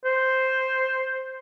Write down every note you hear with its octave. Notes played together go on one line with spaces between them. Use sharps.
C5